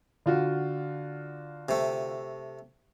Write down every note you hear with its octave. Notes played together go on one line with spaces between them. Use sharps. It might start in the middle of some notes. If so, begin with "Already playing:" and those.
D3 F4 F#4
C3 A3